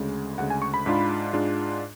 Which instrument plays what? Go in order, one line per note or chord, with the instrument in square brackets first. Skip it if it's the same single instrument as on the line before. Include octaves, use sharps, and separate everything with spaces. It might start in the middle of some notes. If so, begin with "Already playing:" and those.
Already playing: [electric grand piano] D2 C#3 G#3
D2 C#3 G#3 F#5
G#5
C#6
B5
G#2 G#3 D4 F4
G#2 G#3 D4 F4